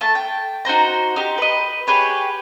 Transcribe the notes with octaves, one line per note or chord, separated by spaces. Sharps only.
A3 A5
G5
D#4 F#4 C5 A#5
D#4 G4
B4 D#5
G4 G#4 B4 C#5